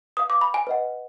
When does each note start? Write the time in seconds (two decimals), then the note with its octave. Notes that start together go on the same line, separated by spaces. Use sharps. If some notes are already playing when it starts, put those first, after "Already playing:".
0.17 B4 F5 D#6
0.30 D6
0.41 B5
0.54 G#5
0.67 B4 D#5 F#5